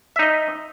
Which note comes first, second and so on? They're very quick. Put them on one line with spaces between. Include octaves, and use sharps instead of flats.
E5 D#4 D#5